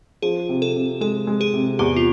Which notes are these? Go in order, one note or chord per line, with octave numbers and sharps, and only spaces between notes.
F3 G#4
C3
A4
C3
G#3 A4
G#3
G#4
C3
E2 G4
F4